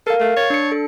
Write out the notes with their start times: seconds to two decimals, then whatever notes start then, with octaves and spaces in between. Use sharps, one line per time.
0.07 A4 A#4 F5
0.20 A3
0.37 C#5 A6
0.50 D4 C#7
0.72 A4